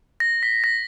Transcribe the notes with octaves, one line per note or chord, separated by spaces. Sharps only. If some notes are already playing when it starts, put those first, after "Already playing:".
A#6
B6
A#6